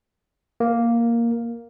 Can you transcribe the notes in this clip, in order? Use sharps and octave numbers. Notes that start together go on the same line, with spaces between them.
A#3